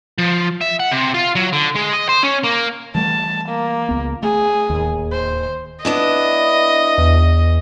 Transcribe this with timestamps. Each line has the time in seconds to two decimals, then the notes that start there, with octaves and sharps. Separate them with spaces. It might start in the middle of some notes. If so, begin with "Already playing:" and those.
0.18 F3
0.61 E5
0.80 F#5
0.92 C3
1.14 F4
1.35 F#3
1.52 D3
1.75 G#3
1.93 D#5
2.09 C5
2.23 C#4
2.44 A#3
2.95 E3 G3 A3 A5
3.48 A#3
3.89 C#2 B3
4.23 A3 G#4
4.70 D1 D#2
5.12 C5
5.85 B3 D4 E4 D#5
6.98 E2